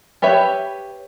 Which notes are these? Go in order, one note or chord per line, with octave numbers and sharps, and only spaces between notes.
G4 B4 C#5 E5